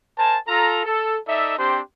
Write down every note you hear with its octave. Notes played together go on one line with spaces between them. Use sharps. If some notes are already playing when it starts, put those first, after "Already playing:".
A#4 C5 G#5 A5
F4 A4 A#5
A4
D#4 A4 D5 E5
C4 D4 G4 C5 G5 C6